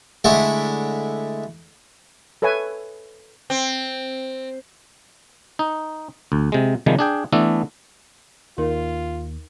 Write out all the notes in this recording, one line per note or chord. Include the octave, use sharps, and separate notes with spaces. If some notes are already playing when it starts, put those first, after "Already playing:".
D3 G#3 A3 E4
A4 B4 C#5 E5 G#5
C4
D#4
D2
C3 G#3
C3 D#3 F3 G3 G#3
D4 G#4 G5
E3 A3 B3 D4 A4
D#2 D#4 F4 A#4 C6